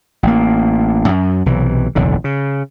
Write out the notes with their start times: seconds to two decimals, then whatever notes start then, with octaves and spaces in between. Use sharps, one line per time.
0.23 A1 A#3
1.08 F#2
1.46 B1 C3 E3
1.95 F#1 B1 E2 D3
2.24 C#3